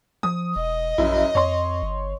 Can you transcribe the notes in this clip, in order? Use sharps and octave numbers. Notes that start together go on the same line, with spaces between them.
F3 D#6
E1 D#5
A#1 F#2 E4
F2 C#5 C6
G1